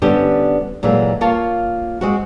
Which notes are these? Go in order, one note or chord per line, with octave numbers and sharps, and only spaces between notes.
D3 G3 B3 C#4 G4 C5
A#2 E3 F#3 G#3 A3
A#3 F4 C#5 A5
G#3 C4 F#4